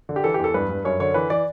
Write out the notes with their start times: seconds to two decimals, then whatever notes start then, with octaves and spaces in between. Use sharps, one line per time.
0.09 D3
0.16 G4
0.24 E3 A4
0.34 G4
0.40 E2 A4
0.54 G2 B4
0.69 G2
0.85 F#2 C#5
1.00 D3 C#5
1.14 E3 B4
1.30 E3 D5